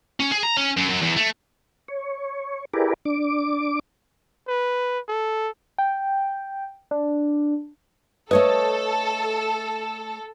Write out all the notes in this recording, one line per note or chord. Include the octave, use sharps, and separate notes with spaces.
C#4
G#4
A#5
C#4
F#2
F#2
E2
A3
C#5
E4 G4 G#4 A#4 B4 D5
D4 D6
B4
A4
G5
D4
A3 A4 B4 C#5 D#5